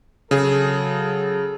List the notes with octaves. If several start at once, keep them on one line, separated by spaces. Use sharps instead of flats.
C#3 F#3 G#4 A4